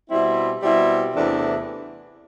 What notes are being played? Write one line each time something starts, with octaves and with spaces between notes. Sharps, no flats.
B2 G3 C4 E4
B2 G3 C4 E4
E2 C3 E3 A3 D4